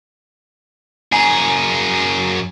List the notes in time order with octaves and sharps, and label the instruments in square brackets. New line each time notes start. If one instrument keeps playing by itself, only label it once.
[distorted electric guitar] F#2 G#4 [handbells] G#5 A#5